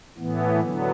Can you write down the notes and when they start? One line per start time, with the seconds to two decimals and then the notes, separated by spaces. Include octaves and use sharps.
0.18 A2 E3 B3
0.61 D3 F#3 B3